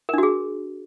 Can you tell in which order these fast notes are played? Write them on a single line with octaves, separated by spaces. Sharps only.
A#4 D4 F#4 G#4